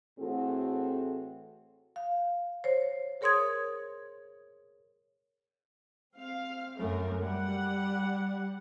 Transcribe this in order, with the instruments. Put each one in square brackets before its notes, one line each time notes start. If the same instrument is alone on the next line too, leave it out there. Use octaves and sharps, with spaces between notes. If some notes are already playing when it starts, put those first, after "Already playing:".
[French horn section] A2 E3 C4 F#4 G#4 A4
[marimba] F5
C5 C#5
G#4 A#4 C#5 C6 D#6 G#6
[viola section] C4 F5
[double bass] F#2 A3 [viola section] A#4
[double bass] G3 [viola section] G4 F#5